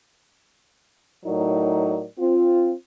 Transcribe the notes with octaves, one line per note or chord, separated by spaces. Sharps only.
A2 F#3 D#4 A#4 D5
C4 F4